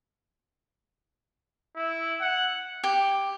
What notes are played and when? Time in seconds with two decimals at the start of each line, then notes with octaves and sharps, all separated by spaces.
1.76 E4
2.21 F#5
2.84 G4